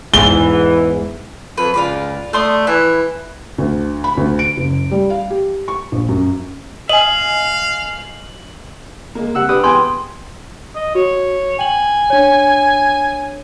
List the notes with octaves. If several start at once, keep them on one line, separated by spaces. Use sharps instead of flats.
E2 G#2 E3 G7
F2 B4
C#2 F4 D5 B5
A3 D5 C6 D#6
E3 E4
D2
B5
D2
D7
F#1
G3
F5
G4
C#6
A#1
F#2
D#5 F5 G#5 F#7
G#3 A#3
C3 F#5 E6
D4 G4 B4 D#6
E2 G5 G#5 C6
D#5
F#4 C#5
G5 G#5 F#7
D4 C#5